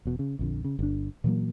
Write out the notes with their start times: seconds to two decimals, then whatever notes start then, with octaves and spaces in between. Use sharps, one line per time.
0.05 E1 B2
0.19 C#3
0.39 A#1 F2 D3
0.64 C#3
0.79 G1 D4
1.24 A#2 E3 F#3 A#3